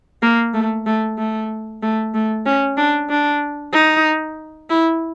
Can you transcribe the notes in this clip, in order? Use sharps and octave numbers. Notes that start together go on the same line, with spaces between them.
A#3
A3
A3
A3
A3
A3
C#4
D4
D4
D#4
E4